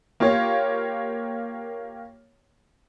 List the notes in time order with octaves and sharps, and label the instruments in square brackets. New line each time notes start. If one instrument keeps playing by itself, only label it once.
[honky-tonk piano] A#3 F4 G4 C#5